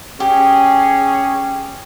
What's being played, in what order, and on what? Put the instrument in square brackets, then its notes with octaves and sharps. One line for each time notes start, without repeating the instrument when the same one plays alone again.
[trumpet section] C#4 G#4 [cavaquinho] G4